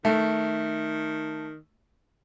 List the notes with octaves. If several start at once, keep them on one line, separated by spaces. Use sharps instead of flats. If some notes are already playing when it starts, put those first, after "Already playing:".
D#3 A3